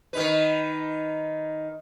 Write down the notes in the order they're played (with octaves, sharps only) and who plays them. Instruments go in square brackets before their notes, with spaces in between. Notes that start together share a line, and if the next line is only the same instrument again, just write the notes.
[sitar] D#3 D#4 B4